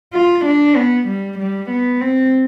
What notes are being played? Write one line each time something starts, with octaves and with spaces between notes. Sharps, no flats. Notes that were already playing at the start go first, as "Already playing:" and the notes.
F4
D4
B3
G3
G3
B3
C4